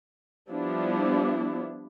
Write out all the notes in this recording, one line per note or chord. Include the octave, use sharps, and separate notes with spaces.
F3 G3 B3 D4 E4